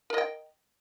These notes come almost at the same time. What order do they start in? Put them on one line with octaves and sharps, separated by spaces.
A#4 D#5 G5